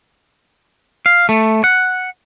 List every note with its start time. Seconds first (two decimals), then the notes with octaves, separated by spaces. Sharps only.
1.06 F5
1.29 A3
1.64 F#5